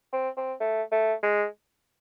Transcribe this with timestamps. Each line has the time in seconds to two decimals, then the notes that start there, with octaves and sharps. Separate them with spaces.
0.13 C4
0.37 C4
0.60 A3
0.92 A3
1.23 G#3